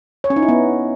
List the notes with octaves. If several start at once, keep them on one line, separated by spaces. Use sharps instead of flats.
C#5
C#4
D#4
E4
B3